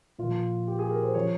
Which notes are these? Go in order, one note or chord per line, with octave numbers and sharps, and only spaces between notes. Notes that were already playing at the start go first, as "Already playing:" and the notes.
A#2 F3 F4
G4
G#4
A#4
C5
C#3 F3 C#5